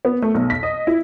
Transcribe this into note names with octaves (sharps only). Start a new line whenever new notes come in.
B3
A3
B1
B6
D#5
E4